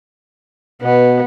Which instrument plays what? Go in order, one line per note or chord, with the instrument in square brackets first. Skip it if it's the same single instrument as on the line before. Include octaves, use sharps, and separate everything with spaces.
[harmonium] B2 [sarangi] B3